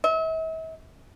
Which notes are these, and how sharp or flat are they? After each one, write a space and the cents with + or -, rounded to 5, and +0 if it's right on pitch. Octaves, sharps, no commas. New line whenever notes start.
E5 -40